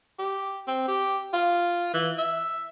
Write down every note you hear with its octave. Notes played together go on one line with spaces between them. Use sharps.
G4
C4
G4
F4
E3
E5